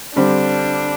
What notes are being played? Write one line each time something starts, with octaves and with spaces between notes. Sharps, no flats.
D3 G3 C4 D4